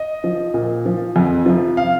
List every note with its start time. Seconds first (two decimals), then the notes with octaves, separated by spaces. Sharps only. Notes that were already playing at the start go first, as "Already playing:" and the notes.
Already playing: D#5
0.24 F3
0.54 A#2
0.86 F3
1.16 F2
1.46 C3 F3
1.77 F5